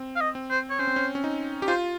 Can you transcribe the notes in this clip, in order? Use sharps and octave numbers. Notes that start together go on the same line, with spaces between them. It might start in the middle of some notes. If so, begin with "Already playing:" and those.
Already playing: C4
F5
D#5
C4
C5
C#5
C#4 C5
C4
C#4
C#4
D#4
G4
F4 C5